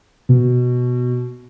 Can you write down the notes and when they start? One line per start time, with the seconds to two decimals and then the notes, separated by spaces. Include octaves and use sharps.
0.29 B2